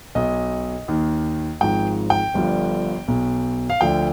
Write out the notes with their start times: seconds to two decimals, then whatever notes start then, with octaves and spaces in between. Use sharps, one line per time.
0.15 B1 B2 D#5
0.88 D#2 D#3
1.61 G#1 G#2 F3 G5
2.10 G5
2.34 G1 G2 D3 F3
3.08 B1 B2
3.70 F5
3.81 D2 D3 F3 G5